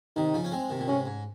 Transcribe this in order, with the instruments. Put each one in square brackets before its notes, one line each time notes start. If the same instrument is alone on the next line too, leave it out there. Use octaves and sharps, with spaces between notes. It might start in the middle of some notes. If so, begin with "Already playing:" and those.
[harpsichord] C3 D#3 [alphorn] D#4
[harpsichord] C#3 F3
C#4
G#3 C4
C3 D#3
A#2
[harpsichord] G#2 C3 [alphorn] C#4
[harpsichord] G#2